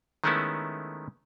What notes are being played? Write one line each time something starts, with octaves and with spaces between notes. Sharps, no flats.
D#3 G#3 A3 B3 C#4 E4